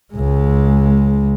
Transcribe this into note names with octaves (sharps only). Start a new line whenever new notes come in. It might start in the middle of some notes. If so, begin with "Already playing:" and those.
C#2 G#3